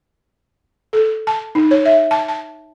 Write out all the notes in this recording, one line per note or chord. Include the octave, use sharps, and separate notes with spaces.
A4
A5
D#4
C#5
E5
A5
A5